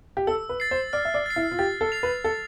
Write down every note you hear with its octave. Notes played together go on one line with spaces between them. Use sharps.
G4
A4 E6
B4
A6 C7
C5
D5 F6
E5
D5
A6 C7
E4
F4
G4 A6
A4
C7 F7
B4
A4 A6